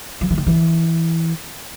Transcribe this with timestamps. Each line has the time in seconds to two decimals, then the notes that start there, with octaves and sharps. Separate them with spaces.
0.21 F3
0.30 E3
0.38 D#3
0.47 E3